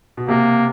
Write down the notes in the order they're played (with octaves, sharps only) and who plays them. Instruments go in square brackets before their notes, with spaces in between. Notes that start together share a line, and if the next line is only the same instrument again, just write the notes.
[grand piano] B2
[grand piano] C3 [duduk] A#3